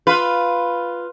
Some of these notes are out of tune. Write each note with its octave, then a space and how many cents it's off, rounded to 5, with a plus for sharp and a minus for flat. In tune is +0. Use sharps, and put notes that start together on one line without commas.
F4 +0 B4 +0